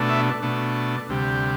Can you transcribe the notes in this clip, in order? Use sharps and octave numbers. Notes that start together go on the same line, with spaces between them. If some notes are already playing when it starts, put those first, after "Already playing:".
Already playing: B2 A3 D4
E5
B2 A3 D4
D2 C3 G3